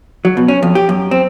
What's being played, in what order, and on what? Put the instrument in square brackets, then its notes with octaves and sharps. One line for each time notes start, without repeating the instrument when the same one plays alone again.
[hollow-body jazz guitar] F#3
B2
C#4
F2
G4
F#2
C4